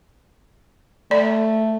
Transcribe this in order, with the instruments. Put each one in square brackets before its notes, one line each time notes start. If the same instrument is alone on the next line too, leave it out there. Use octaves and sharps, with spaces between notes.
[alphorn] A3 [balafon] D5